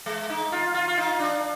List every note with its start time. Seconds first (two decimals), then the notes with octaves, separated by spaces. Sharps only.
0.06 G#3
0.30 D#4
0.52 F4
0.75 F4
0.88 F4
0.98 D#4
1.20 D4